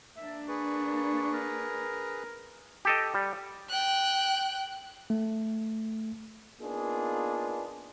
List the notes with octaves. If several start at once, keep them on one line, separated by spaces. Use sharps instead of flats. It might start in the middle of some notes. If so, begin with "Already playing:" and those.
A#3 D4 E5
G#4 B4 C#6
A#4
G4 A4 D#5
G3
G5 F#6
A3
A#3 B3 D4 D#4 F4 G#4